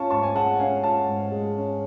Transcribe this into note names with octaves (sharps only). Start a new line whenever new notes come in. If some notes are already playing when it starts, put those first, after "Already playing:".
Already playing: C#4 F4 A5 C#6
G#2 A5 C#6
G#5
G#3 F#5 A5
C#4 F5 G#5
F4 F#5 A5
G#2
G#3
C#4